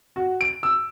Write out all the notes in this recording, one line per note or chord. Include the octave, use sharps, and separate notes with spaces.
F#4
D7
E6